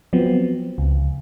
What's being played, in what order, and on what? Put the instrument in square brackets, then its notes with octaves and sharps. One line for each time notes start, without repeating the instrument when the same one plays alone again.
[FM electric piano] F3 F#3 B3 C4
C#2